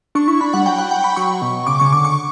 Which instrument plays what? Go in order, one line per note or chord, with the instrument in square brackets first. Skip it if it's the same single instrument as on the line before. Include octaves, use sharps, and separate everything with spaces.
[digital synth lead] D4 [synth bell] C#6
[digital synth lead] E4 [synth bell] C#6
[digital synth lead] D4 [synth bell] B5
[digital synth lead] G3 [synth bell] F#5
[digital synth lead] F#3 [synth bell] G5
[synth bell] F#5
G5
B5
[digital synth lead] F#3 [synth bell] C#6
[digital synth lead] B2
[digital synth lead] C#3 [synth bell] D6
[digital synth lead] C#3 [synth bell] C#6
[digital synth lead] D3 [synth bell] D6
[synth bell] C#6